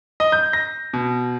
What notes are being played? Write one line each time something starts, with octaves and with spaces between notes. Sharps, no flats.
D#5
G6
A#6
B2